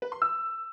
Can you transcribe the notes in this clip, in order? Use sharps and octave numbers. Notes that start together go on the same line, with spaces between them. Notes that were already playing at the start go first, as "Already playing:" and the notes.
B4
C6
E6